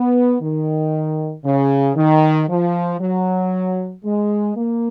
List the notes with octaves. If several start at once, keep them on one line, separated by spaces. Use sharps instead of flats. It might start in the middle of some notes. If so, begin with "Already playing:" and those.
Already playing: B3
D#3
C#3
D#3
F3
F#3
G#3
A#3